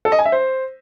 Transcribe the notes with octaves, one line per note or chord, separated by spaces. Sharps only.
A4
D#5
G#5
E5
C5